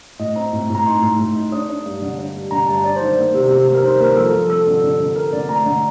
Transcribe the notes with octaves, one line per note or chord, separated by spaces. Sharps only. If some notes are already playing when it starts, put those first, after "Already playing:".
A2 D#5
C4 A#5
A2
A2
A#5
D#4 C6
A2
A2
D#4
D4 D#6
D4
G2
D3
D4
G3
D3 A#5
G2 A5
D4 D5
C5
D#3
C5
A#3
C3
C3
C3
A#4
D#3 C5
A#3 A#4
F3 A4
F3
C4 A4
D3
D3
D3
C4 A#4
D3 D5
A3 A#5
D3